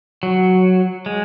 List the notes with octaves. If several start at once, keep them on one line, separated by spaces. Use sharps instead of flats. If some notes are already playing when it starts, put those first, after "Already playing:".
F#3
G#3